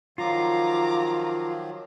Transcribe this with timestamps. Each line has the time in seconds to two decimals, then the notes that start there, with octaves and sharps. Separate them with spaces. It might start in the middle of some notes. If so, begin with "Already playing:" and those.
0.18 D#3 F3 F#3 F4 A#5 D6